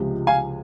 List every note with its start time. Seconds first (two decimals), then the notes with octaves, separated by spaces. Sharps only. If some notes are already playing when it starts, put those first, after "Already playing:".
Already playing: C#2 C3 F3 G#3
0.27 F5 G#5